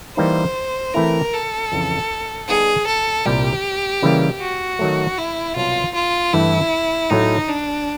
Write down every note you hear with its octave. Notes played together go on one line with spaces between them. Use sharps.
E3 G3 A#3 D#4 C5
E3 A3 C4 E4 A#4
A4
F2 C#3 E3
G3 B3 D#4 G#4
A4
C2 A#2 G3 G4
C#3 E3 G3 A#3
F#4
D#3 F#3 A3
E4
C2 B2 F#3 F4
F4
G2 E3 A3 E4
A2 F#3 A3 D#4
D4